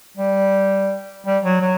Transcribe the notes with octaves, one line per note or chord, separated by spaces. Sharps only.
G3
G3
F#3
F#3